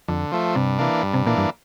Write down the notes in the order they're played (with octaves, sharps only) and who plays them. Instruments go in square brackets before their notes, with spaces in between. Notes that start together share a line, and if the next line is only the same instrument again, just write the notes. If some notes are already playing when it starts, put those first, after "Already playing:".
[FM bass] F2 [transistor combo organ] D3
[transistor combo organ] F3 A3
[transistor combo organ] G2 [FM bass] C3
[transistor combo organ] E3 A#3 D4
G2
[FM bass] C3
[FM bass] A#2 [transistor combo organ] E3 A#3 D4
[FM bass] G2